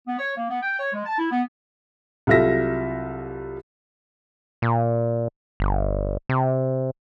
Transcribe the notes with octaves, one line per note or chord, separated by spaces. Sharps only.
B3
C#5
A#3
B3
G5
C#5
G#3
A5
E4
B3
C2 F#3 F4 A4 E5 A#6
A#2
G1
C3